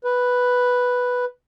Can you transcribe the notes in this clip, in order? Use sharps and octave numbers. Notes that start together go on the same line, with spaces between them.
B4